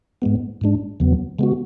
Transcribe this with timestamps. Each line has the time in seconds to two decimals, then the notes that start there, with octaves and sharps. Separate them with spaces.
0.22 G#2 G#3 B3
0.61 G#2 G#3 D4
1.00 E2 C#3 F#3 B3
1.39 C#3 G#3 B3 F#4